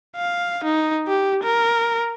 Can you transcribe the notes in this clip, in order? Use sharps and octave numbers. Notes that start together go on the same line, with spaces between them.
F5
D#4
G4
A#4